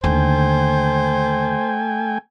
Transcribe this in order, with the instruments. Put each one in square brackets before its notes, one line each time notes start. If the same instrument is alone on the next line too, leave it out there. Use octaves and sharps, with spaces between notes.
[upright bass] D#2 D3 [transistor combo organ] A3 G5 G#5 [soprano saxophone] C5